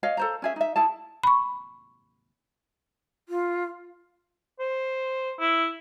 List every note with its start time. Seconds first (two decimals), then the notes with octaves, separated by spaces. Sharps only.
0.03 C#5 D#5 F5
0.17 A4 C5 A#5
0.42 C#4 G#4 E5
0.56 D#4 E5
0.76 E4 G#4 A5
1.23 B5 C#6
3.29 F4
4.60 C5
5.40 E4